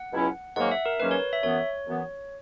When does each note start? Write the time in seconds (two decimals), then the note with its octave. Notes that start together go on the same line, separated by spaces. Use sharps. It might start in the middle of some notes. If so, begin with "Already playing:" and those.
Already playing: F#5
0.13 C#2 B2 F#3 C#4 E4
0.56 G#2 D#3 F#3 A#3 C#4 F#5
0.71 E5
0.86 A#4
1.00 G#2 D#3 F#3 A#3 C#4 B4
1.11 C#5
1.33 E5
1.43 F#2 E3 B3 C#5
1.87 F#2 E3 B3